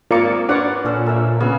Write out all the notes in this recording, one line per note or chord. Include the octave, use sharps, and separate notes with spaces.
G#1 A#3 F4 A#4 D5 C#7
D4 F4 A#4 B4 C#5 D5 F#5
A#2 C#4 A4 C5
A4 A#4 E5
C#3 B3